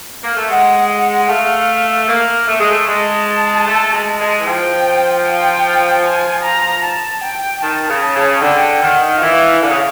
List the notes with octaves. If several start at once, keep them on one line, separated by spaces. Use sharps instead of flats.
A#3
A3
G#3 F#5
F#5
A3 F5
A#3
A3
G#3
A3
G#3 A5
A3
G#3
G#3
E3
F3 G5
G5
G#5
A#5
A5
G5
D#3 A5
C#3
A5
C#3
D3 G5
D#3 F#5
F3
E3 F5
D3
C#3